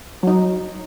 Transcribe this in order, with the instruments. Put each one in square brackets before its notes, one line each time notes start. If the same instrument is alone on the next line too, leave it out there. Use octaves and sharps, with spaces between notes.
[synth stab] F#3 D#4